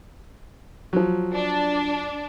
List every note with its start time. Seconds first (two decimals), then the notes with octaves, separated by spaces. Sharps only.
0.93 F3 F#3
1.33 D4